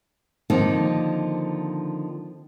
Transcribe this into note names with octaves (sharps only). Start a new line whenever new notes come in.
D3 D#3 F3 A#3 C4 D#4